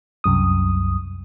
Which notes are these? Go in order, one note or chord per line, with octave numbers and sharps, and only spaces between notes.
C2 F#2 D#6